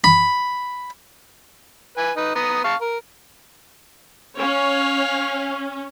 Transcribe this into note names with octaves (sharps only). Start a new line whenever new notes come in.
B5
B4 G#5
D#4 B4
B3 A#5 D#6
F5 A5 C#6
A#4
C#4 C#5 F5